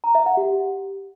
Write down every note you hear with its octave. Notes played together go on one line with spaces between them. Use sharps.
A#5
E5
F#5
G4